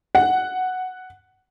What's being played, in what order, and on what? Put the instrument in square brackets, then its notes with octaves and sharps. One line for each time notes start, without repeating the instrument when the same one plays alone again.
[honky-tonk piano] F#5